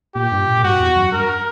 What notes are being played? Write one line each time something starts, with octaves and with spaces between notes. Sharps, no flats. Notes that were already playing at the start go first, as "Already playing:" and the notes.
A#2 G4
G2
A#2
A#2
G2 F#4
E2
F#2
G2 A#4